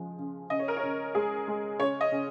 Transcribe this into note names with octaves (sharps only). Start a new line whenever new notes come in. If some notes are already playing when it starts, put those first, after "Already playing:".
Already playing: C#3 F3 G#3
C#3
C#3 D#5
C#5
A#4
C#5
C#3
G#3 G#4
G#3
C#3 C#5
D#5
C#3